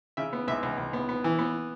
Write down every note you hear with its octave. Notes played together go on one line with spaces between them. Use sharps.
C#3 E5
B3
C#2 E5
C#2
C#2
B3
B3
E3
B3